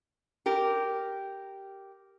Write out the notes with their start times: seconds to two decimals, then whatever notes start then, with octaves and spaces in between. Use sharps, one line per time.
0.46 G4 A#4